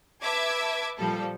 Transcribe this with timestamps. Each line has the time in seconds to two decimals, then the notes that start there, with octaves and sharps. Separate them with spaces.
0.22 B4 E5 A5 D6 G#6
0.98 A#2 F3 G3 A4